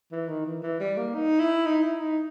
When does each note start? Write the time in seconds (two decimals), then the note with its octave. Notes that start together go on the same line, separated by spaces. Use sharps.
0.12 E3
0.28 D#3
0.46 E3
0.62 E3
0.80 G3
0.97 A#3
1.15 D#4
1.40 E4
1.66 D#4
1.83 E4
2.00 D#4